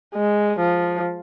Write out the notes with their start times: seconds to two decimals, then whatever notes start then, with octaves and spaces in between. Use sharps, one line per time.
0.15 G#3
0.59 F3